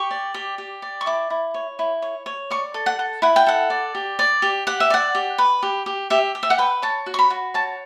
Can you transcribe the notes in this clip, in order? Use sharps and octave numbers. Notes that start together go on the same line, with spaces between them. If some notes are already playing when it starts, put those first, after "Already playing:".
Already playing: G4 C#6
D5
G4
G4
D5
C#6
E4 D6
E4
C#5
E4
C#5
C#5
D5 C#6
A4
F#5
A4
E4 F#5
G5
A4 F#5
D5
G4
D5
G4
G4 F#5
E5
D5 F#5
G4
B4
G4
G4
G4 E5
G4
E5
F#5
B4 G5
C#5 A5
F#4
C#6
B5
F#4
C#5 A5